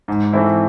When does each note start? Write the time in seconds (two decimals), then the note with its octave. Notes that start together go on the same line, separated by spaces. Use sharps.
0.08 G#2
0.33 E3 A3 C4 E4